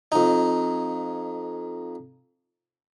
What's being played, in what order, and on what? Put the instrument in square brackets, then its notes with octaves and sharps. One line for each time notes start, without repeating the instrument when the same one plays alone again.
[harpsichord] F2 D#4